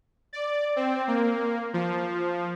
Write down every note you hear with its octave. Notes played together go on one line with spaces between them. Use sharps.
D5
C4
A#3
F3